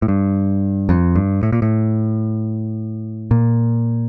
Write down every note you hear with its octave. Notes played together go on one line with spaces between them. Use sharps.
A2
G2
F2
G2
A2
A#2
A2
A#2